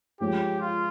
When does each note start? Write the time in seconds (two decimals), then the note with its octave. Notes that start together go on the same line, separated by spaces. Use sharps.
0.20 F3 G#3 C#4 G4
0.60 F4